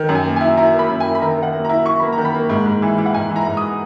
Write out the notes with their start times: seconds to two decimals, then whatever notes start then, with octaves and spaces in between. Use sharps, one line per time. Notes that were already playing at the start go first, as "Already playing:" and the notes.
Already playing: D#3
0.09 F#2
0.15 G#5
0.25 A#3
0.36 E4 G#5
0.57 E4 A#5
0.74 A#3
0.79 B5
0.89 F#2
1.00 E4 G#5
1.15 B5
1.22 D#3 A#5
1.37 D#3
1.43 F#5
1.53 A#3
1.65 E4 A#5
1.85 E4 C#6
2.00 A#3 B5
2.13 A#5
2.18 D#3
2.25 B5
2.34 A#3
2.50 G#2
2.66 G#2
2.82 E3
2.98 E3
3.06 F#5
3.14 G#2 G#5
3.30 E3
3.36 A#5
3.47 G#2
3.57 D#6